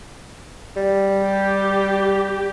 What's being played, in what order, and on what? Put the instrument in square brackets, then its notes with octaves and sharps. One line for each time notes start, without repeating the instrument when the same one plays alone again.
[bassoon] G3
[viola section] G4